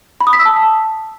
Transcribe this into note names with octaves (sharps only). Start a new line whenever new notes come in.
B5
D#6
B6
E6
A5